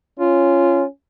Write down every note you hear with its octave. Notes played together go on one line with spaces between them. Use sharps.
C#4 F4